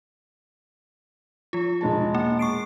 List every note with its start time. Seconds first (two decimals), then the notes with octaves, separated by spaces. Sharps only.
1.53 F3 F4
1.81 E1 G#3 A5
2.15 A#3
2.39 C#6 C7 D7